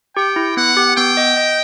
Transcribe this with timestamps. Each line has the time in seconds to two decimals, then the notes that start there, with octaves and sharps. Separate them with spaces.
0.16 G4 G5
0.36 E4
0.57 B3 F#5
0.77 G4
0.97 B3 G5
1.17 D#5
1.37 D#5